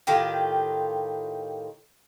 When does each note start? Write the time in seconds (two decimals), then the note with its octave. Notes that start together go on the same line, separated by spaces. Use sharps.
0.07 A2 D#3 F4 G4